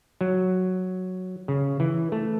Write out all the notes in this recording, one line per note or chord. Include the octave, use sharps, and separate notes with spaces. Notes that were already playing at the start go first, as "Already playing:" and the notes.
F#3
C#3
E3
A3